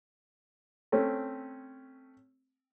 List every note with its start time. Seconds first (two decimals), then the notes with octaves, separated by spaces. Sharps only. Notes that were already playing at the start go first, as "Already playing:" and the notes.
0.92 A3 C4 C#4